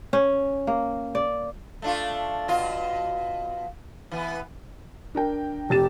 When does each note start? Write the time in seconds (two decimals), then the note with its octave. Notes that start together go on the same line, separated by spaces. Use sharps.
0.13 C#4
0.67 A#3
1.15 D5
1.82 A3 D4 F4
2.48 B2 F4
4.11 E3 B3
5.15 D4 A#4 G5
5.70 F1 G4 A6 E7